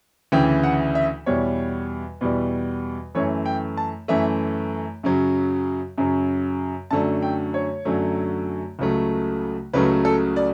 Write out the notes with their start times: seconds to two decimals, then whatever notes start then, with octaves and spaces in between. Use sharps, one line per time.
0.32 D2 C#3 E3 G5
0.63 F#5
0.95 E5
1.26 E2 B2 G3 C#5
2.21 E2 B2 G3
3.15 F#2 E3 A3 C#5
3.46 G5
3.77 A5
4.08 F#2 E3 A3 E5
5.03 F#2 C#3 F#3
5.98 F#2 C#3 F#3
6.91 F#2 D3 F#3 A3 A5
7.22 G5
7.54 C#5
7.85 F#2 D3 F#3 A3
8.79 C#2 C#3 F#3 A3
9.73 C#2 C#3 F#3 A3 B4
10.05 A4
10.36 D5